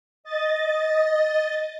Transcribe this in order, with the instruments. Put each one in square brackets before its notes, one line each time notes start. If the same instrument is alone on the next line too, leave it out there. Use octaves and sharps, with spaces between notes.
[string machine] D#5 A6